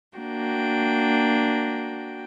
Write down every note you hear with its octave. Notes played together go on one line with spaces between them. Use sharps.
A#3 D4 F#4 G5